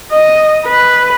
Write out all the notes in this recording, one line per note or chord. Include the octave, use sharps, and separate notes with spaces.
D#5
B4